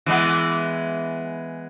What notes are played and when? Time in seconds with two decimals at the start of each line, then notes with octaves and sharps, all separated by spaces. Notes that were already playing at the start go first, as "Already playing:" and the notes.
0.06 E3 G#3 B3